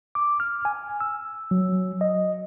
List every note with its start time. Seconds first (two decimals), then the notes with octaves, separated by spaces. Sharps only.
0.15 D6
0.40 F6
0.65 G#5
1.00 E6
1.51 F#3
2.01 D#5